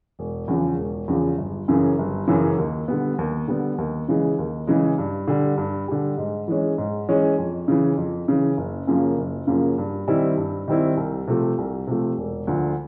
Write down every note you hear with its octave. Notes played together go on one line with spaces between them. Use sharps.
E1
E2 C#3 F3
E1
E2 C#3 F3
G1
F#2 C#3 E3
G1
F#2 C#3 E3
D#2
D3 G3 B3
D#2
D3 G3 B3
D#2
C#3 E3 G#3
D#2
C#3 E3 G#3
G2
D3 G3
G2
D3 G3
G#2
E3 G#3 C#4
G#2
E3 G#3 C#4
F2
C#3 E3
F2
C#3 E3
F#1
F#2 C#3 F3 A#3
F#1
F#2 C#3 F3 A#3
G2
D#3 G3 C4 E4
G2
D#3 G3 C4 E4
C2
C3 F3 A3
C2
C3 F3 A3
E1
D2 D3 F3